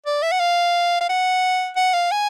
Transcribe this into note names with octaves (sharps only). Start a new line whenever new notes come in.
D5
E5
F#5
F5
F5
F#5
F#5
F5
G#5